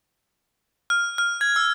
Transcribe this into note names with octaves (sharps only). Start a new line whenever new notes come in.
F6
F6
G#6
E6